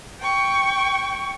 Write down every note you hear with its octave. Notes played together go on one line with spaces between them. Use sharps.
G5 C#6